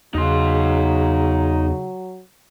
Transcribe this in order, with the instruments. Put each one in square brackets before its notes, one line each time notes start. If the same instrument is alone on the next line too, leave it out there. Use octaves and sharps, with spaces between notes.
[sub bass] E2 [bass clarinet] C#3 [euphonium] F#3 [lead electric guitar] D#4 C6